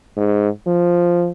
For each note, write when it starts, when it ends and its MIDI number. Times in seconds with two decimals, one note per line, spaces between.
0.17 0.49 44
0.67 1.30 53